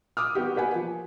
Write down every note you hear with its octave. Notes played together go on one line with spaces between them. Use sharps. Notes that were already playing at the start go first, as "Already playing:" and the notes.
D6 D#6 F6
B3 F#4 G4
A#3 G4 B4 F#5 G#5
F3